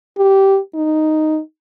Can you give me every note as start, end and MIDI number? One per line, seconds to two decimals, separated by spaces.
0.18 0.58 67
0.75 1.39 63